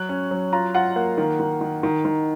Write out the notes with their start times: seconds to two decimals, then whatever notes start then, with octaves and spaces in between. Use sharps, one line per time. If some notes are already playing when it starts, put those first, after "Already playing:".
Already playing: F#3 F#6
0.09 C#4
0.31 F#3
0.53 F4 A#5
0.74 F4 F#5
0.96 A#3 F#5
1.18 D#3
1.40 D#3
1.61 D#3
1.83 D#3
2.05 D#3